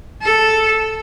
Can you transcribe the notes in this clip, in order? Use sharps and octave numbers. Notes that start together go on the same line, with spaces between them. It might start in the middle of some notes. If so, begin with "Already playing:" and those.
A4